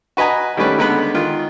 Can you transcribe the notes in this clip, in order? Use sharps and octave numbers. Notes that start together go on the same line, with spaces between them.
F#4 B4 D#5 G#5 A#5
D#3 G3 A3 C#4 B4
D3 G#3 B3 B4 B5
D#3 F4